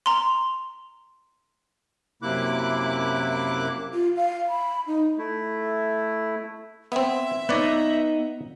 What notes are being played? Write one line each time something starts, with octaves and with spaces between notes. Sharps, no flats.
A#5 C6
F#2 C3 A#3 E4 D6 F#6
F4
F5
B5
D#4
A3 E4
B3 C4 E5
B3 D#4 B4 C#5 D5